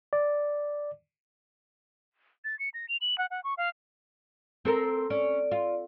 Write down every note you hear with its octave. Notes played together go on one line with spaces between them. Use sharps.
D5
A6
C#7
A#6
F7
F#7
F#5
F#5
C#6
F5
C4 A4 A#4
C#4 D5
F4